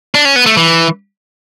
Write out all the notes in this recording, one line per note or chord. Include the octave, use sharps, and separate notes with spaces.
D4
C#4
B3
A3
E3